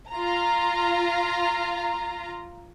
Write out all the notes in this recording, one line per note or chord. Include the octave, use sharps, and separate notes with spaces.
F4 A#5